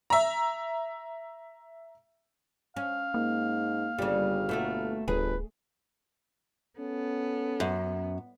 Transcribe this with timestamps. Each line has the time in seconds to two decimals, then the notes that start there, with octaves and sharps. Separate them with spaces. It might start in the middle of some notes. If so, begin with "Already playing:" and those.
0.10 E5 A#5
2.76 C#4 F5
3.14 G#2 A#3
3.98 G1 C#3 G3
4.49 B2 A3 A#3
5.08 D1 G1 G#4 B4
6.79 B3 C#4 A4
7.60 F#2